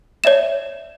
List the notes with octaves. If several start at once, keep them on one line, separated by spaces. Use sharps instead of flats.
C#5 D5 E5 E7